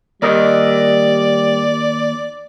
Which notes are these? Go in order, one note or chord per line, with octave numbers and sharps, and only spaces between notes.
D#2 G3 A#4 D5 D#5